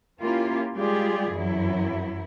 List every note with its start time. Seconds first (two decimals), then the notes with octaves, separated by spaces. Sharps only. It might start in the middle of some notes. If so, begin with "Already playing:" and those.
0.21 A#3 C#4 E4 F4 G4
0.75 G3 G#3 F4 G4 G#4 D5
1.29 F#2 E3 F#3 E4